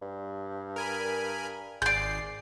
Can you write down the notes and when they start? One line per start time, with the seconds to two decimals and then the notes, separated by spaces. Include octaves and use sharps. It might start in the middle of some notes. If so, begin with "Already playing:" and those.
0.02 G2
0.76 A#4 G#5 B5
1.82 G#1 G#4 D5 G6 C7